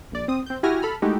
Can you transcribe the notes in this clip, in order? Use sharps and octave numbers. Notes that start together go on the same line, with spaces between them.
A#1 D5
C4 D#6
C4 G6
E4 F#4 G4 G#5 F6 A#6
A4 B5 F6
G#3 A3 D#4 E4 F#4 G4